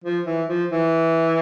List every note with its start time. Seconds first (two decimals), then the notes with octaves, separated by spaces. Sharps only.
0.04 F3
0.27 E3
0.49 F3
0.72 E3